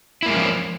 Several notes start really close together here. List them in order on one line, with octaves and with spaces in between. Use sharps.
E4 A#3 G#3 C#4 F3